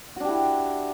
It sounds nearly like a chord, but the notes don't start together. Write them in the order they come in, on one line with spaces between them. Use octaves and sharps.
F#4 D4 G4 E4